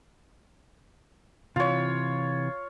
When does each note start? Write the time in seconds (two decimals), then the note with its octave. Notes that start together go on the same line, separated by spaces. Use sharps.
1.56 C3 E3 F4 C#5